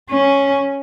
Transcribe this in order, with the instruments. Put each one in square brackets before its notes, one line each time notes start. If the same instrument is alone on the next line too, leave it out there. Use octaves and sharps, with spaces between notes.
[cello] C#4